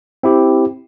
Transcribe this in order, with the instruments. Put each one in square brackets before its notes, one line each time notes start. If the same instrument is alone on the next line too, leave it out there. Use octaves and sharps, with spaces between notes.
[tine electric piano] C4 E4 G4